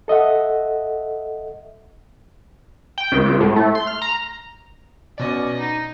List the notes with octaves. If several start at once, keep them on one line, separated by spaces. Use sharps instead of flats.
A4 D#5 E5 F#5
G5
C#2
C#2
A2
A3
C6
F6
A#5
B2 C#4 D5 D#5
D#4